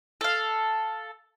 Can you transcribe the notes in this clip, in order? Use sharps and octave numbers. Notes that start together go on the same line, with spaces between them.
A4 F5